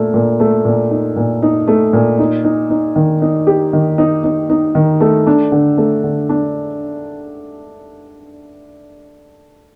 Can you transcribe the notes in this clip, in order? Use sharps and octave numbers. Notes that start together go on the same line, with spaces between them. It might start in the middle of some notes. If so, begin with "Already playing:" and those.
Already playing: A#2 A3
A#2
A3
A#2
D#4
A#2
D#4
A3
A#2
D#4
D#4
D#4
D#3
D#4
G4
D#3
D#4
D#4
D#4
D#3
A3
D4
D3
A3
D3
D4